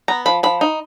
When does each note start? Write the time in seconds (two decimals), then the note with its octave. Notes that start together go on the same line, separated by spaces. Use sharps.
0.08 B3 A#5
0.26 F3 B5
0.43 F3 B5
0.61 D#4